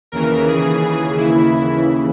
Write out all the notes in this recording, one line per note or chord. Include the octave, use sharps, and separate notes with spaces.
D#2 C#3 E3 A#4
G#4
G#4
E4
E4